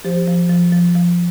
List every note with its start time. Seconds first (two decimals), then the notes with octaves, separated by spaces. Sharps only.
0.05 F3 G4 C5
0.27 F3
0.50 F3
0.72 F3
0.95 F3